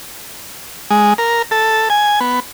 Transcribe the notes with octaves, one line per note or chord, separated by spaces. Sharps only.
G#3
A#4
A4
G#5
B3